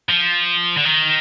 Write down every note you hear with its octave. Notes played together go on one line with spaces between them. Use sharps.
F3
D3
D#3